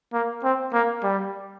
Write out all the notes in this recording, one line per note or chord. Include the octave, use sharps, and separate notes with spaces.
A#3
C4
A#3
G3